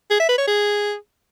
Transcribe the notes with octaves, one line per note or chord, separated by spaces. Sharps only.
G#4
E5
B4
C#5
G#4